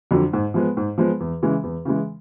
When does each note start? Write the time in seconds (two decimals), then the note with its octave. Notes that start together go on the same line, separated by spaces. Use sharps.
0.11 F2 D3 F#3
0.33 G#2
0.54 F3 G#3 B3
0.77 G#2
0.98 F3 G#3 B3
1.20 E2
1.42 C#3 E3 G#3
1.63 E2
1.85 C#3 E3 G#3